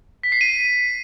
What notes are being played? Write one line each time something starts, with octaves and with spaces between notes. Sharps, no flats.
B6
C7
D#7